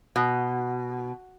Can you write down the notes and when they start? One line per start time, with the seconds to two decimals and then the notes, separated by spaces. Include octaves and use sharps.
0.16 B2